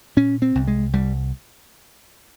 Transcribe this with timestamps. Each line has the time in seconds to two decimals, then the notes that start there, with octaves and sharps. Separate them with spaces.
0.17 A#2 C#4
0.42 C4
0.55 C2
0.67 G#3
0.93 C2 G3